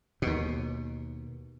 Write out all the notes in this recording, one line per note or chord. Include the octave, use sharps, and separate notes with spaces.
D#2 B2